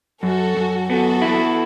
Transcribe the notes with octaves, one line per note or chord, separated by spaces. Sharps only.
F#2 F#4 A4
F#2
B3 F#4 A4
E4